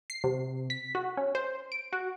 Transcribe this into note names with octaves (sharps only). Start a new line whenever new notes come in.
C7
C3
B6
F#4
C#4
C5
D7
F#4